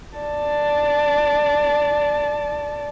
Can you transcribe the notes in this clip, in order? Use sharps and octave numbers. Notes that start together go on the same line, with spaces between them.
D5 A5